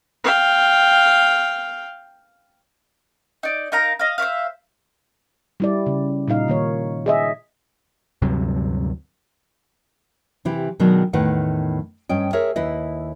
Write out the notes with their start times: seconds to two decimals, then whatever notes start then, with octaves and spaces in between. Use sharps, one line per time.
0.24 F5 G5
3.43 D#4 D5
3.72 D#4 A#4 F5 A#5
3.99 D#5 F5
4.18 C5 C#5 E5 F5
5.60 G3 E4 D5
5.86 C#3
6.28 A#2 G3 D#4 F5
6.48 D#3 A#3 C#5
7.06 G#4 D#5 E5
8.22 D2 G2 C3 F#3
10.45 C3 E3 E4 G4
10.80 B2 D#3 F#3 G#3 D4
11.13 E2 A2 D#3 B4 F#5
12.09 G2 C#4 D#5 G5
12.33 G#4 A#4 C#5 E5
12.56 D#2 E4 B4 D#5